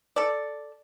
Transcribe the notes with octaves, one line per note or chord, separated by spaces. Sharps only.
A4 D5